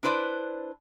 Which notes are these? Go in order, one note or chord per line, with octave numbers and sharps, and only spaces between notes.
D4 E4 B4 C5 D5